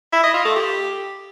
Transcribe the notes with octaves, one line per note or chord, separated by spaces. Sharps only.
E4
D#5
F4
A3
G4